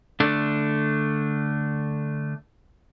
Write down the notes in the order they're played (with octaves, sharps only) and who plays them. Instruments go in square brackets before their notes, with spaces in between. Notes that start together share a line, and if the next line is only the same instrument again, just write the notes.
[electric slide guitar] D3 A3 D4